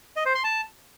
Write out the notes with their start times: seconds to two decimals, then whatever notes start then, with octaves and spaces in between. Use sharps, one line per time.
0.16 D#5
0.26 C5
0.35 C6
0.44 A5